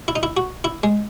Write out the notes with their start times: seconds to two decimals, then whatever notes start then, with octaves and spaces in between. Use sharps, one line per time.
0.08 E4
0.16 D#4
0.23 E4
0.37 F#4
0.64 E4
0.83 G#3